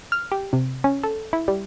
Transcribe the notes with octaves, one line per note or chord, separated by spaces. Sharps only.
F6
G4
C3
C#4
A4
E4
G3